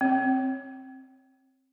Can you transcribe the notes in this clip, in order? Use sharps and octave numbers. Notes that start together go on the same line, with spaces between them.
C4 C#5